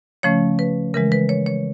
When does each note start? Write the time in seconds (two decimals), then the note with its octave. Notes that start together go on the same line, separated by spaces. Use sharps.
0.23 C#3 F3 A3 C#4 C#5
0.59 B4
0.94 C#3 E3 G#3 A#4
1.12 B4
1.29 C#5
1.46 C#5